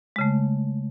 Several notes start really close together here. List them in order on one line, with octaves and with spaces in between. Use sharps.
G#3 C#3 A3